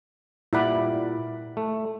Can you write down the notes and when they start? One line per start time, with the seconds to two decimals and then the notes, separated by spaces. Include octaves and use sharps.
0.53 A#2 G3 E4 D5 F#5 B5
1.57 A3